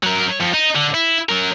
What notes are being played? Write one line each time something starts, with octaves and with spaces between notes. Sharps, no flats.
F#3 A#4
F2
D#4
D3
E4
F#3 A#4